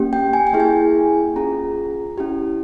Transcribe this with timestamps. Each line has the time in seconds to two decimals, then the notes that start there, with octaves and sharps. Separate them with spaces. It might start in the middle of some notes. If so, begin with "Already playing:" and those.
Already playing: A#3 C#4 G4
0.13 G5
0.33 G#5
0.47 G5
0.53 A#3 E4 G#4
0.60 G#5
1.36 C#4 F4 G#4 A#5
2.18 C#4 E4 G4